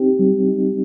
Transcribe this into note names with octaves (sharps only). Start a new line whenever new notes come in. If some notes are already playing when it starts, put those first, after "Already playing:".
Already playing: C4 D#4 G4
G3
D#4